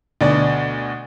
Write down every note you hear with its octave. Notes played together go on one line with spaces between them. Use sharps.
D2 B2 D4 D5